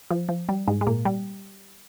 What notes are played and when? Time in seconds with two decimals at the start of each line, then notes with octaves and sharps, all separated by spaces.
0.11 F3
0.29 F3
0.49 G3
0.68 G#2 G#3
0.81 G#3
0.87 A#2 A#3
1.05 G3